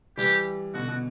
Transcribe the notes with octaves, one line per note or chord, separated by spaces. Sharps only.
E3 G3 G4
B2 D3 F#4
B2